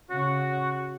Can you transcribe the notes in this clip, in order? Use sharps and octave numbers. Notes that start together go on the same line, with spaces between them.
C#3 F#4